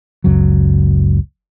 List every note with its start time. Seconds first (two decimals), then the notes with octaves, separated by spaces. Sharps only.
0.24 F#1 C#2 F#2 F#3